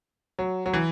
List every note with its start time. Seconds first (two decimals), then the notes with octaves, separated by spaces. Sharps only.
0.39 F#3
0.66 F#3
0.74 E3